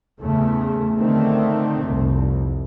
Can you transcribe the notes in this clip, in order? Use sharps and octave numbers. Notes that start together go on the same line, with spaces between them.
E2 C#3 A3
D3 D#3 A3 C4
F1 C2